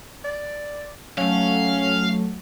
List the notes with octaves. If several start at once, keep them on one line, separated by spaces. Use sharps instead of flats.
D5
F#3 A3 C#4 F5